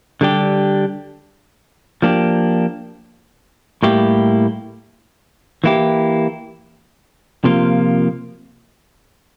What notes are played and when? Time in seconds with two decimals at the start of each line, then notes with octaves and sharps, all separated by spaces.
0.21 D3 G3 D4 G4
2.02 F3 A#3 D4 G4
3.83 A2 G3 A#3 E4 G4
5.64 E3 A#3 E4 G4
7.44 C3 F3 A#3 F4